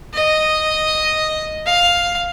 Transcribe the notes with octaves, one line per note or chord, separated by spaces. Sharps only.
D#5
F5